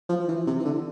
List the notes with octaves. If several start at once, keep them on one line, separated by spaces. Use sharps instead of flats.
F3
E3
C3
E3
D3